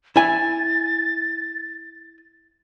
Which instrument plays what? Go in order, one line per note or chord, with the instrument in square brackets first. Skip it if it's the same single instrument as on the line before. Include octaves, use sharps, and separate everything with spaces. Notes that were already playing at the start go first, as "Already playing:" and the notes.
[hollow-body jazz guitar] E4 G#5 [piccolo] A6